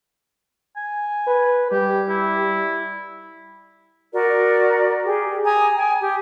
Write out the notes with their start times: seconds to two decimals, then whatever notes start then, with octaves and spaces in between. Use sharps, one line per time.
0.76 G#5
1.27 B4
1.72 G3 G4
2.09 E4
4.13 F#4 A#4 D5
5.05 G4 G#4
5.44 G#5 A#5 D#6 G#6
5.76 G5 G#5
6.01 G4